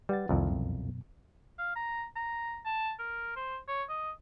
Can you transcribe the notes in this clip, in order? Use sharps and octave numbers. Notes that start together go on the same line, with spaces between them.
G3 B4 F#5 A6
C2 F2 C3 D#3 F3
F#2 B2
F5
A#5
A#5
A5
A#4
C5
C#5
D#5